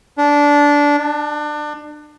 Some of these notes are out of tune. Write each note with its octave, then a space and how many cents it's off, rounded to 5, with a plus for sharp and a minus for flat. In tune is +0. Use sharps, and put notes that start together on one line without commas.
D4 -15
D4 +25